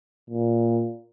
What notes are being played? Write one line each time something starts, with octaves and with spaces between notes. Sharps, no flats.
A#2